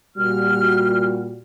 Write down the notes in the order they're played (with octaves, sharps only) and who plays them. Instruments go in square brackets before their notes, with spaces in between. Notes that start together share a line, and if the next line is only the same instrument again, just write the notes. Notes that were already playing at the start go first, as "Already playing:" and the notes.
[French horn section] A#2 G3 F#4 [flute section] F6